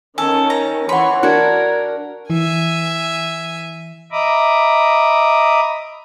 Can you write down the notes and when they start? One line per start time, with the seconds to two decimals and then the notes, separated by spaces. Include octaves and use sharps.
0.18 D#3 C#4 A4 G#5
0.50 A#5
0.89 E3 C#5 F#5 B5 C6
1.23 D4 F#4 A#4 F#6 G#6
2.30 E3 E5 G#5
4.12 D#5 E5 A#5 B5 D6 D#6